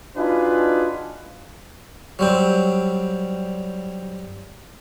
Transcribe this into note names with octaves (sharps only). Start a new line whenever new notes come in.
D4 D#4 F4 F#4 G#4 B4
F#3 G3 C4